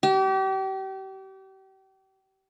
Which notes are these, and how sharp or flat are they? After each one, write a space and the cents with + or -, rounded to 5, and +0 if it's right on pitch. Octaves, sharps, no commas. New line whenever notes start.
G4 -35